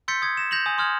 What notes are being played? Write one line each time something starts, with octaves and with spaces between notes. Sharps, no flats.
C6 E6 G6 A6 B6 C#7
D#6 G#6
A#6 E7
G6 A#6 F7 F#7
G#5 D#6
C6 D#6 F6 G#6 F#7